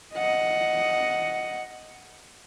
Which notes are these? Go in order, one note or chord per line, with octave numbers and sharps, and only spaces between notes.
D#5 F#5